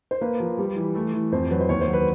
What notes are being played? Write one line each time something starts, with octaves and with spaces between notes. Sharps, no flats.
C5
A#3 B4
F3
G3
E3
A3
E3
F2 C5
F#3 B4
C5
D#2 C#5
C5
F#3
B4